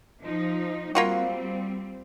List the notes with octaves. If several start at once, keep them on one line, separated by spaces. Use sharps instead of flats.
F3 D#4
G3 A#3 C4 F4 F#4